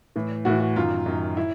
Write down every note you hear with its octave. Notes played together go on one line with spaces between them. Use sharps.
A2 E3
A2 E3 F#4
F#4
F#2 D#3 F4
F#2 D#3
E4